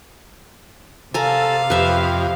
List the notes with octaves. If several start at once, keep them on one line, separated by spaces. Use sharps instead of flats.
C3 A4 F5 G#5 A#5
F2 G4 B4 E5